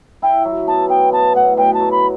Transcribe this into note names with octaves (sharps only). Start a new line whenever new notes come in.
E4 G5
F#3
B3 A5
B3 G5
B3 A5
A2 F#5
B2 G5
A5
F#3
B5